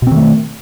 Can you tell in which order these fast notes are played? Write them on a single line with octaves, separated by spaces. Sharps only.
B2 C4 D#3 A3